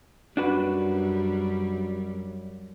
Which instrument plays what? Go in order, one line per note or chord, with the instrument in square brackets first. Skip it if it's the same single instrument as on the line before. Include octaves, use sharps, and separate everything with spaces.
[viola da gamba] F#2 G3 [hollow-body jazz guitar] D4 F#4 B4